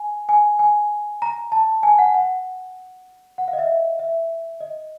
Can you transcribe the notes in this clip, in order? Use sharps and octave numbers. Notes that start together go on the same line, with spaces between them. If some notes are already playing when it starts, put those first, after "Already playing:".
Already playing: G#5
G#5
G#5
A#5
A5
G#5
F#5
F#5
F#5
F5
D#5
E5
E5
D#5